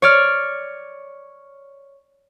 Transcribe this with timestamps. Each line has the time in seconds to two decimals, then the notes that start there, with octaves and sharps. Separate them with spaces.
0.02 C#5 D5 F6